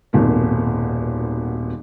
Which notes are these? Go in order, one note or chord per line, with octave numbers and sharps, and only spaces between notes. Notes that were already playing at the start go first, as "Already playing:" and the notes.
D#1 G#1 B2 A#3